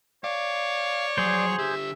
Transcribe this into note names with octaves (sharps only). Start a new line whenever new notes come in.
C#5 D5 F5
F3 F#3 G#4 C5
D3 G4 E5